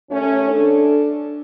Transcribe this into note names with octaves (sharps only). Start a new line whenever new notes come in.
D#2 A3 C#4
D4 A4